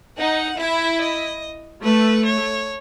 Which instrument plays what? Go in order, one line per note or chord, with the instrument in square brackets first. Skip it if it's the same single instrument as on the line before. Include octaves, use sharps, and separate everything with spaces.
[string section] D#4 [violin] F#5
[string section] E4 [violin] E5
[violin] D#5
[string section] A3 [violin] B4
[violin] C#5